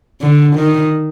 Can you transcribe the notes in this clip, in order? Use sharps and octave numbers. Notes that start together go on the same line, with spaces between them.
D3
D#3